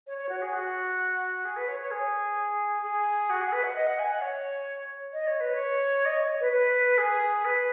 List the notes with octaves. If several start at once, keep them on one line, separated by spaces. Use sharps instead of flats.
C#5
C#5
F#4
G#4
F#4
G#4
B4
C#5
C#5
G#4
G#4
F#4
G#4
B4
F#5
D#5
F#5
G#5
F#5
C#5
D#5
C#5
B4
C#5
D#5
C#5
B4
B4
G#4
B4